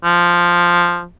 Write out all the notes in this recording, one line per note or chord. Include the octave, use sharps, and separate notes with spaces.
F3